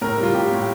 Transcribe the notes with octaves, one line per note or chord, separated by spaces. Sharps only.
A2 A#4
G3
F4
A2 G4
A2